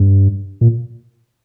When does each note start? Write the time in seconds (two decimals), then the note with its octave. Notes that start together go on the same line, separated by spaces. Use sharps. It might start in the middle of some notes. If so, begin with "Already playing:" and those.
Already playing: G2
0.61 A#2